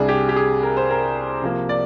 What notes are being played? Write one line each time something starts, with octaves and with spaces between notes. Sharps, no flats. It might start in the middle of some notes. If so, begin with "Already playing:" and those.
Already playing: C2 C3 G3 D4 G#4
G4
G4
G#4
A#4
C5
A#4
C3 F3 A#3
D5